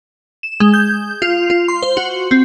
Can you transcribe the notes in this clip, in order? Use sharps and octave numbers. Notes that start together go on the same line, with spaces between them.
E7
G#3
G6
F4
F4
C6
C5
F#4
C4